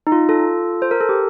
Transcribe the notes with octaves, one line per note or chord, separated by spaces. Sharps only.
D#4
F4
F4 A4
C5
A#4
A4
G4